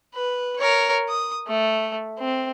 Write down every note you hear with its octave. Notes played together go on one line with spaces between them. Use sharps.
B4
A#4 C#5
D#6
A3
C4